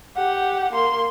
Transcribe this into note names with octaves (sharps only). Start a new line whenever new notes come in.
G4 F#5
A#3 C6